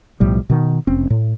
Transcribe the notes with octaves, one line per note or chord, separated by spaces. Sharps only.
B1 A2 F3 G3
B2 D#3
F1 C4 C#4
A2